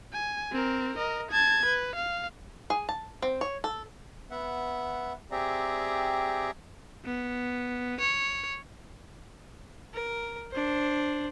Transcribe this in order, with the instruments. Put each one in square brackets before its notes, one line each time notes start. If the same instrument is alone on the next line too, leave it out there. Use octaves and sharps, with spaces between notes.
[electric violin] G#5
C4 A#4
A#4 D#5
A5 G#6
B4
F5
[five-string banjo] G#4
A5
C4
C#5
A4
[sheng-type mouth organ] B3 E5 F#5
C4 G4 G#4 D5 E5 A#5
[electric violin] B3
C#5
[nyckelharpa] A#4
D4 C5